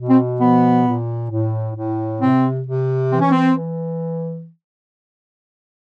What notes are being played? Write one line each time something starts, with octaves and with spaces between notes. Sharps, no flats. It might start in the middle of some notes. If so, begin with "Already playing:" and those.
Already playing: B2
C4
F3 B3
A#2
A2
A2
C3 C4
C3
E3 C4
C#4
C4
E3